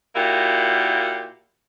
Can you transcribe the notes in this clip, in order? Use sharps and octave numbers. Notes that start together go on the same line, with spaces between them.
A#2 A#3 E4 F#4 G4